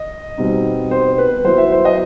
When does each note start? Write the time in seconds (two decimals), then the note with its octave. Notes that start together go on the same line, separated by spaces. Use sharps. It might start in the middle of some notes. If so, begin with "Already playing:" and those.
Already playing: D#5
0.37 B2 G3 C4 D#4
0.91 C5
1.18 B4
1.44 F#3 B3 E4 C5
1.58 E5
1.72 C5
1.85 D#5